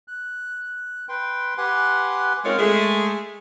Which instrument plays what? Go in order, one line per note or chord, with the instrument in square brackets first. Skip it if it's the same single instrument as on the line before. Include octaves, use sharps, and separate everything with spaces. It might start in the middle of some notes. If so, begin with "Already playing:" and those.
[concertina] F#6
B4 G5 C6
G4 B4 F#5 G#5 C6 F#6
[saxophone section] G#3 C4 D#4 F4 A#4 C#5
G#3 A3 G#4